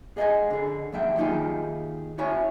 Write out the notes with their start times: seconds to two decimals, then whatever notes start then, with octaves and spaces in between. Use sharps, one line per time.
0.17 G#4 D#5 E5 F#5 G#5
0.50 D3 G#4
0.93 D#2 F#3 E5 G5
1.17 D#3 A#3 D#4 F4 G4 G#4
2.18 E4 F#4 C#5 E5 G#5